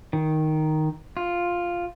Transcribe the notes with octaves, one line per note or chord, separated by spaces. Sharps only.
D#3
F4